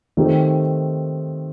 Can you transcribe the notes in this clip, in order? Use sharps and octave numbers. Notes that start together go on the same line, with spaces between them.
D#3 A3 C4 G4